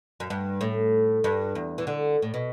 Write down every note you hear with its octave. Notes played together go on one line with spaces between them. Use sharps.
F#2
G2
A2
G2
E2
E3
D3
A2
B2